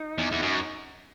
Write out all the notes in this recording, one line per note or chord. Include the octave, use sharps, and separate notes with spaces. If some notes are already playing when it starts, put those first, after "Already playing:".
Already playing: D#4
E2
E2
F#2